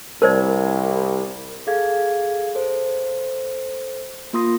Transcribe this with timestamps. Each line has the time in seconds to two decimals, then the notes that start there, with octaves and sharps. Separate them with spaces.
0.22 C2 A#4 C5 D5
1.67 G#4 A4 F5 G#6
2.55 A4 C5
4.33 A#3 F4 C6 D#6 A#6